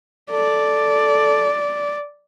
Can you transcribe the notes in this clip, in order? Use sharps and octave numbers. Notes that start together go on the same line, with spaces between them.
A4 D5